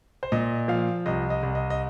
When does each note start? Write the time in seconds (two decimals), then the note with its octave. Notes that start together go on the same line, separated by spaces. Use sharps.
0.23 C5
0.32 A#2 D#5
0.68 F3 F5
1.06 C2 D#5
1.30 D#5
1.43 C2
1.55 D#5
1.70 D#5